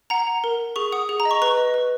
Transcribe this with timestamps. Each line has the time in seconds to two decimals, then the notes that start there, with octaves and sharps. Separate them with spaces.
0.10 F#5 A#5
0.27 F#5
0.44 A#4
0.60 A#4
0.76 G#4 C#6
0.92 F#5 D#6
1.09 G#4
1.20 A#5
1.25 D#5
1.31 C#6
1.42 B4 C#6
1.57 D#5
1.74 B4